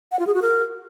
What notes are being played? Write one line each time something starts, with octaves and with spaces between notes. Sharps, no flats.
F#5
F4
G#4
F#4
A#4